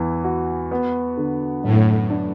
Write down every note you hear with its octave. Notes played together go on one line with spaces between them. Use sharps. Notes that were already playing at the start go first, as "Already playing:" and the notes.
Already playing: E2 E3
F#4
B3
D3
F#2 A2
D4